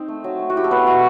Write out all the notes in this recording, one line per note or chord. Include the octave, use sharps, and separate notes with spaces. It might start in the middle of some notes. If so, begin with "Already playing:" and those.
Already playing: C4 D#4
A3
F#3
A3
F#4
E4 G4
A4
F#3 B3 B4
E4 F#4